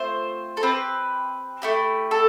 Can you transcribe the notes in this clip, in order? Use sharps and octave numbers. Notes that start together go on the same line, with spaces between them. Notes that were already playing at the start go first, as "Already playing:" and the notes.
Already playing: A3 C4 F4 C5
A4
C4 G4 B4
A3 E4 G4
A4